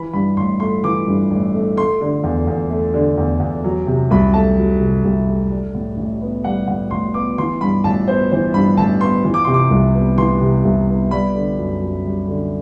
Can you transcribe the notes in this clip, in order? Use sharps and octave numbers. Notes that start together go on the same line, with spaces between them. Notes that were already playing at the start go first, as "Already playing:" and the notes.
Already playing: E3 B5
G2 B5
A1 C6
A3 C6
E3 D6
G2
A1
A3
A3 C6
D3
E2
E2
A3
D3
E2
E2
F#3
C3
C2 B5
A3 A5
F#3
C3
C2
A3
G3
A2
A1
B3
G3 F#5
A2 F#5
A1 C6
B3 D6
E3 C6
G2 B5
A1 A5
B3 C5
E3 C5
G2 B5
A1 A5
B3 C6
E3
D6
C3 C6
D6
C2
B3
E3 C6
C3
C2
B3
G3 B5
D3
F#2
F#2
G3
D3